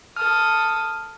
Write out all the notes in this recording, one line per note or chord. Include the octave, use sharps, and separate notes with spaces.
A4 D#6 F6